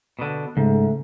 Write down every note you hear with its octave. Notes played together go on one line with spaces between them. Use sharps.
B2 D3
G#2 C#3 A3